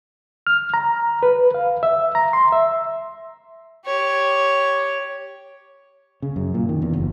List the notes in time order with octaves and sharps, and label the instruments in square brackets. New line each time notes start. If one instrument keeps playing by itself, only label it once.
[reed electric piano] F6
A#5
B4
F5
E5
A#5
C6
E5
[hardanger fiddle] G4 C#5
[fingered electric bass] C#3
F#2
A#2
D#3
E2
F#1